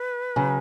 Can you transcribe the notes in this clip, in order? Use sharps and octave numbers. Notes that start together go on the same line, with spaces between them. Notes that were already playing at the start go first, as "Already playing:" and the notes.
Already playing: B4
C#3 F#3